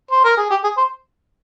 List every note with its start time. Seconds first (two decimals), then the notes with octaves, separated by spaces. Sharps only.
0.11 C5
0.24 A#4
0.37 G#4
0.50 G4
0.64 G#4
0.77 C5